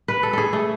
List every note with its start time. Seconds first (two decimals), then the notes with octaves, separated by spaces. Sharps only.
0.08 B4
0.23 A4
0.33 G#4 A4
0.53 A3